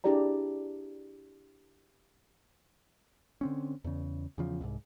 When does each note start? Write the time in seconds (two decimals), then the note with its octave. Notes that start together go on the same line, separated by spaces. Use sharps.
0.04 D4 E4 G4 G#4 D5 A#5
3.41 D3 C4 C#4
3.84 E2 C#3
4.38 E2 C#3 F3
4.61 C2 G#2